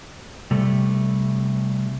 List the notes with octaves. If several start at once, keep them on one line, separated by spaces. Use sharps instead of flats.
C3 G3 A3